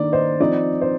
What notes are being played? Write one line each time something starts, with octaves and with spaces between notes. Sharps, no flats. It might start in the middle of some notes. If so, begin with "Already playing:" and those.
Already playing: D#3 A#3 D4 D5
C5 D#5
F3 C4 D#4 D5
C5